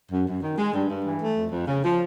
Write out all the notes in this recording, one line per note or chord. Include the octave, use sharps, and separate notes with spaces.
F#2
F#2
D#3
G#3
G2
G2
E3
A3
F2
F2
C#3
F3